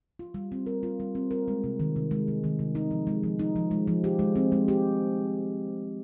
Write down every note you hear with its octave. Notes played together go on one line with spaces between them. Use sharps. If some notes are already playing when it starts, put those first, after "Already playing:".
F4
G3
C4
A#4
F4
G3
C4
A#4
G#3
C3
D#3
C3
G#3
C3
D#3
C3
D#4
F3
G#3
F3
D#4
F3
G#3
F3
G4
G#3
C4
G#3
G4